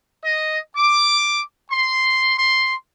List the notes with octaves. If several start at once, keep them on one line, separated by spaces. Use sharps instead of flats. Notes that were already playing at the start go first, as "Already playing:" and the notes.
D#5
D6
C6
C6